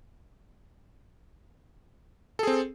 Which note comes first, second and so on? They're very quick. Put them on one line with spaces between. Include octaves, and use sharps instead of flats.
A4 G#4 C4